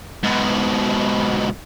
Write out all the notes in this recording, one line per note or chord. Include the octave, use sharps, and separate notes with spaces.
G#2 B2